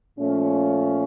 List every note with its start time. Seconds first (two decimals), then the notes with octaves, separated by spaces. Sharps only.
0.18 A#2 F3 A3 C#4